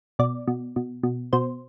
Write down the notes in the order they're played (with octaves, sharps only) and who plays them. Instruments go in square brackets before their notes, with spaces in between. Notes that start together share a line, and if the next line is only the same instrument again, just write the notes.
[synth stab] B2 D5
B2
B2
B2
B2 C5